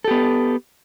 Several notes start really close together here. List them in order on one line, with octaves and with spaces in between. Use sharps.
A4 G4 B3